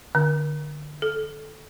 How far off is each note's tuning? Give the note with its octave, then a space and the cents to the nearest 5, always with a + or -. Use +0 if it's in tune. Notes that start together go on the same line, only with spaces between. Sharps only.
D3 +20
A4 -15